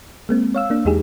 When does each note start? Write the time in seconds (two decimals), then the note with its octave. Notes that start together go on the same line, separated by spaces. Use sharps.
0.29 G#3 A#3 C4
0.55 C#5 F5 E6
0.70 A#3 D4
0.85 E2 G#3 D#4 G4 G#4